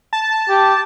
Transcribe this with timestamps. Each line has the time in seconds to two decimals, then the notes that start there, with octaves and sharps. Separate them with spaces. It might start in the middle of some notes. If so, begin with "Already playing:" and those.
0.13 A5
0.49 G4